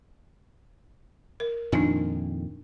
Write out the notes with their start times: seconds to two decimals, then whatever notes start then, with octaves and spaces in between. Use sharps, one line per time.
1.40 A#4
1.72 F2 A#2 D#3 D4 D#4 G#5